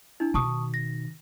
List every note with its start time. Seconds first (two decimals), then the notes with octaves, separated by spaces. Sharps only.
0.20 D4 E4
0.34 B2 D#3 A5 C#6 D#6
0.74 A#6